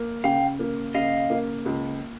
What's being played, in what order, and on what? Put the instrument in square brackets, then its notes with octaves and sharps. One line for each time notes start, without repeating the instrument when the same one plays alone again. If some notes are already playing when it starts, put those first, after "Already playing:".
Already playing: [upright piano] A#3
[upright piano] C#3 [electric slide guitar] F5 G5
[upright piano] A#3
[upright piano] C#3 [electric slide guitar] D#5 F5
[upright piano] A#3
C#2